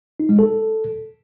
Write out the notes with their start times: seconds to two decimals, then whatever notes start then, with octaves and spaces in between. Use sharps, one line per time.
0.20 D#4
0.29 G#3
0.39 A4